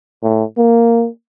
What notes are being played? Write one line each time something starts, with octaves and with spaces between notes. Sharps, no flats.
A2
A#3